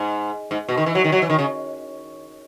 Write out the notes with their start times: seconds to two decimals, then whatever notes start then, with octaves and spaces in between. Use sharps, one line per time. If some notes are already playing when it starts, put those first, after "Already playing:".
Already playing: G#2
0.51 G#2
0.68 B2
0.77 D#3
0.86 E3
0.95 F#3
1.04 D#3
1.12 F#3
1.22 E3
1.30 D#3
1.39 C#3